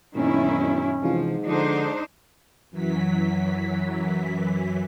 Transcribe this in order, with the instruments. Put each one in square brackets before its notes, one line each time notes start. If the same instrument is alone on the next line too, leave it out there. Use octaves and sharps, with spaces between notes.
[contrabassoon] E1 [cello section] F#2 D#3 E4 [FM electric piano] A#2 [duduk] C#4
[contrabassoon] G#2 [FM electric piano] C3 E3 F4 [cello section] F3
[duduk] D3 [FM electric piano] F3 [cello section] D4 D#4 C5
[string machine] F#2 E3 F#3 B6